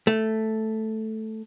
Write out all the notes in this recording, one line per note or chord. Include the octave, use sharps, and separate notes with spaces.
A3